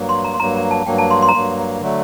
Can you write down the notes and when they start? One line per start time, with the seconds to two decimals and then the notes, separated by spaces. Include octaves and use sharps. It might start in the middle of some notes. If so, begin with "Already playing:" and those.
Already playing: G2 F#3 A#3
0.09 C6
0.24 A#5
0.34 C6
0.40 G2 F#3 A#3 A#5
0.56 A#5
0.71 A5
0.86 G2 F#3 A#3 G5
0.98 A5
1.11 C6
1.22 C6
1.29 A#5
1.34 G2 F#3 A#3 C6
1.81 D3 F#3 A3